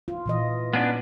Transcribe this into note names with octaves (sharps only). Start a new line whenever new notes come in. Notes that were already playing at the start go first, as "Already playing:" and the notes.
F4
A#2 E3 D#5
B3 C#4 D4